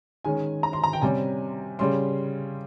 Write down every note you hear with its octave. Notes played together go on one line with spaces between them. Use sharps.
D#3 G#3 C#4 G#5
A#5
C6
A#5
G5
C3 G3 C#4 G#5
C#3 G3 C#4 C6